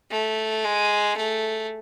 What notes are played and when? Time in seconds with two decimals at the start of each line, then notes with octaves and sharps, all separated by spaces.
0.11 A3
0.64 G#3
1.17 A3